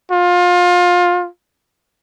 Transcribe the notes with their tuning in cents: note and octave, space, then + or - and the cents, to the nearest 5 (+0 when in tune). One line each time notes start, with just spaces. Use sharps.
F4 +25